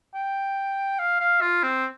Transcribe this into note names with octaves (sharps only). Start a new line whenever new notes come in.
G5
F5
F5
F4
C4